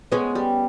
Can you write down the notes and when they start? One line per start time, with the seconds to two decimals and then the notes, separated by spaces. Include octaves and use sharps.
0.12 G#3 B3 C#4
0.35 G3